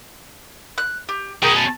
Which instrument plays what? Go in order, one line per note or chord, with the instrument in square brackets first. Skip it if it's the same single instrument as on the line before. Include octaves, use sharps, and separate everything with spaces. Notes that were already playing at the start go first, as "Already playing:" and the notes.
[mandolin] F#6
G4
[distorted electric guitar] B2 C#4 [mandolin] G#4 A#4 G5
[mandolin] A5